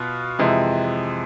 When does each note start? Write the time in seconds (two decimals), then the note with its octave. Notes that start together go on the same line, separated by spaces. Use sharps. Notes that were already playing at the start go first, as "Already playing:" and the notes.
Already playing: B2 B3 F4 B4
0.39 F2 C3 E3 G#3